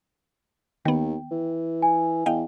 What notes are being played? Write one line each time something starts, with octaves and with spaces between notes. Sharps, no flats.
D#2 D#3 B3 G5
E3
G#5
E2 D#5 F5 G5